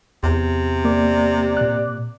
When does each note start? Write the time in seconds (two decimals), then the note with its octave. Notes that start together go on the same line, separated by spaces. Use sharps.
0.23 E2 C3
0.85 A#3 D5
1.57 A#2 F#6